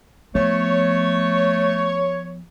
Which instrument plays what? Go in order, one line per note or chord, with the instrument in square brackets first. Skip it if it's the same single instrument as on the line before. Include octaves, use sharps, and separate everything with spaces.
[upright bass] F3 B3 [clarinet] A3 [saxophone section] C#5